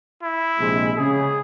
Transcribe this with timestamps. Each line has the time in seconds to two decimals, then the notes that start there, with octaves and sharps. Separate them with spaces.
0.23 E4
0.59 A#1 C3 G#3
0.97 C#3 G#4